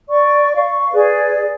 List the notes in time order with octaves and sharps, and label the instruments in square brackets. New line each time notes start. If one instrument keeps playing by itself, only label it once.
[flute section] D5 C#6
F5 C#6
G#4 B4 D5